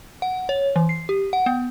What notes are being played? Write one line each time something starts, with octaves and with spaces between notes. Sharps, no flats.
F#5
C#5
E3
C7
G4
F#5
B3